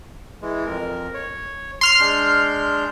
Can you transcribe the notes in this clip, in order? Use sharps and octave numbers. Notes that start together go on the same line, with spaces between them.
E3 G#3
F2 A#4
C#5
C6 F6 C7
G#3 D4 G6